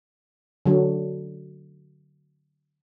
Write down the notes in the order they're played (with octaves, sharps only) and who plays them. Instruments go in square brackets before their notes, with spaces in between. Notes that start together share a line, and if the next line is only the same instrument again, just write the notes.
[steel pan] D3 F#3